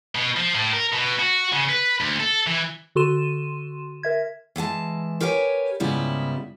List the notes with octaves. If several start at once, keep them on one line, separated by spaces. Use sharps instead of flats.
B2
F3
A2
A#4
B2
F#4
C#3
B4
D2
A4
E3
D3 F#4 A4 C6 D#7 E7
A#4 E5 G#6
E3 G#3 G5 A5
G4 A#4 B4 C#5 E5 G#5
G#2 C#3 G3 B3 E4 F4